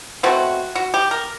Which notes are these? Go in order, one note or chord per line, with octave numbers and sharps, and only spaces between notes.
B2 F#3 A3 C4 F#4
F#4
G4
A#4